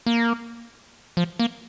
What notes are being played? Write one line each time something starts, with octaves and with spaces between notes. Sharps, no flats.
A#3
F3
A#3